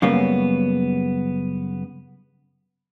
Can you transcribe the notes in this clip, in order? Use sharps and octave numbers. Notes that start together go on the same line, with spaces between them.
F#2 C#3 G3 A#3 B3